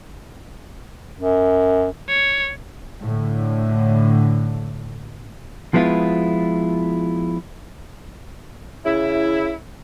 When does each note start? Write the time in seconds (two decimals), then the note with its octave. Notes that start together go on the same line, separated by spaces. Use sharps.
1.18 F#2
2.09 C#5
3.02 A2 D3
5.74 F3 G#3 B3 E4 F4
8.85 C#3 E4